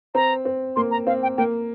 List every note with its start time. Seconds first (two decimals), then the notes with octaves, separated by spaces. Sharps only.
0.15 C4 A#5
0.45 C4
0.76 A#3 C6
0.91 A#5
1.07 C4 F5
1.22 G5
1.37 A#3 G5